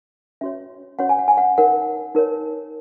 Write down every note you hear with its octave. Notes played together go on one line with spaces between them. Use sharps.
C#4 F#4 C#5 E5
C#4 F#4 C#5 F#5
G#5
F#5
G#5
F#5
D#4 A#4 C#5 F#5
D#4 A#4 C#5